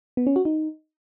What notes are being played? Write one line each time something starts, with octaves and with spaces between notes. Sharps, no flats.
B3
C#4
F#4
D#4